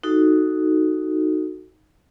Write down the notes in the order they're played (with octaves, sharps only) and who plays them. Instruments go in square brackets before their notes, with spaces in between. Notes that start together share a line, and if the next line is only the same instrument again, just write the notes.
[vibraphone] D#4 F#4 A4